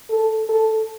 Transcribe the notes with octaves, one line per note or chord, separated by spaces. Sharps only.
A4
A4